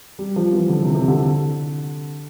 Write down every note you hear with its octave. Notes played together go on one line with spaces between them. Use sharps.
G3
F3
E3
D3
C3
C3
D3